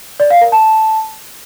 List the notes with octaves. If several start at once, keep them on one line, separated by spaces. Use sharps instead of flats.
D5
F5
A#4
A5